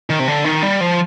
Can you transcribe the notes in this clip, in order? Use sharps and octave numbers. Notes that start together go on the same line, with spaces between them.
D#3
C3
D3
D#3
G3
F3